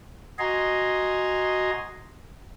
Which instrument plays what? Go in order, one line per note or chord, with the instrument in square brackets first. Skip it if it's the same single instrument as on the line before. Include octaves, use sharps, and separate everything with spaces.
[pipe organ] F#4 D#5 G#5 A#5 C6